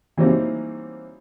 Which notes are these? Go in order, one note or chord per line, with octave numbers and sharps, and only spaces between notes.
E3 F#3 G3 A#3 C4 D#4